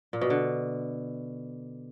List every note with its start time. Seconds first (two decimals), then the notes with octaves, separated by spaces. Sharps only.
0.13 A#2
0.21 B2
0.30 D3